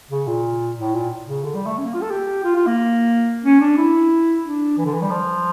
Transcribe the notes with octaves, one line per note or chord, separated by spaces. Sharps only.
C#3
A#2
A2
A#2
C#3
D3
G3
A3
C#4
A#3
F4
A4
G4
F4
F4
A#3
C#4
D4
E4
D4
E3
D3
E3
G3
F3